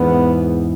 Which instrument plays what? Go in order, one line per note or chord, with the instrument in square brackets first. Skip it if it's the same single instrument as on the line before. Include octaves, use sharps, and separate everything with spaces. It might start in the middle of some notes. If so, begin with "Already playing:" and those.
Already playing: [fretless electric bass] E2 G#2 [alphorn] B3